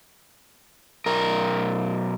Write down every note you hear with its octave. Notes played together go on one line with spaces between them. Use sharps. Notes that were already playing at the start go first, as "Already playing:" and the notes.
B1 A#4